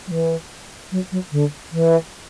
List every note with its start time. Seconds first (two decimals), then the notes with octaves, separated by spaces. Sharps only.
0.07 F#3
0.11 E3
0.92 F#3
1.12 F#3
1.32 D3
1.72 E3